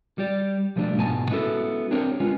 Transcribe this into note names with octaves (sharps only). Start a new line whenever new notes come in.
G3 G4 D5
B2 F3 G3 A3 B3 D4
B1 G#2 B2 G#5 A5
G#3 B3 C#4 E4 F#4 A4
C4 D4 G4 A#4 C#5
G#3 B3 C#4 F4